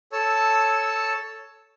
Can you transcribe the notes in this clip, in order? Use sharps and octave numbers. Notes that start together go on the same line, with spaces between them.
A4 C#5 A5 E6